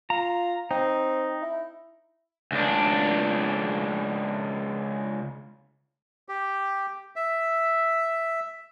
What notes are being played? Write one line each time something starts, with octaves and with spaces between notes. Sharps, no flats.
F4 A#5
C4 D#4
E4
C#2 D4
G4
E5